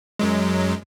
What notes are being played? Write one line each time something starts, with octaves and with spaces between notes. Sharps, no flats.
F#2 F#3 G#3